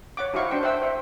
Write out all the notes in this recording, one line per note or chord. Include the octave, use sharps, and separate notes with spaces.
C#5 F#5 D6
D#4 E4 F#4 C5 F5 C#6
D4 C5 G5
C5 E5 F#5 G5 E6
C5 E5